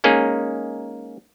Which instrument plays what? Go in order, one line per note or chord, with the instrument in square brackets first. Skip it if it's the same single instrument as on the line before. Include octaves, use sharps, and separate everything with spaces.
[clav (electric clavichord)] G#3 A#3 C#4 D#4 G#4